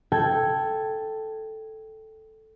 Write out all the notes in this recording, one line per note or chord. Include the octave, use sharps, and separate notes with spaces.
A4 G5 G#6